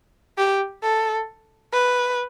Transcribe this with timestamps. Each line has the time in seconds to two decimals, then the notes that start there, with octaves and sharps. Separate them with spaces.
0.38 G4
0.83 A4
1.74 B4